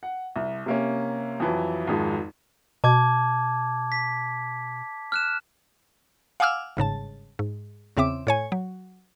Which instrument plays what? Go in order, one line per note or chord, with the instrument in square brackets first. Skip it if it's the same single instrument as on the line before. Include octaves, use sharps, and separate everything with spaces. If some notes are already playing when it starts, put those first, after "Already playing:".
[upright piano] F#5
C2
C3 A#3 C#4
F2 E3 F#3
G#1 F2 G#3
[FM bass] B2 [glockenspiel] A5 D6 G#6
[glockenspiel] B6
F6 F#6 E7
[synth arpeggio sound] F5 F#5 G#5 D6 E6 F6
G1 G#2 C#3 A5
G#2
E2 C#3 C4 E5 D6
A2 C#5 G#5
F#3